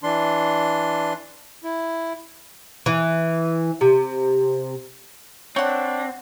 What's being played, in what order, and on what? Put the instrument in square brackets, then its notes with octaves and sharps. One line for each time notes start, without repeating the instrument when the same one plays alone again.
[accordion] E3 D4 C6
E4
[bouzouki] E3
C3
[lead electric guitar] C4 [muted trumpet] D4 [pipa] C#5 F#5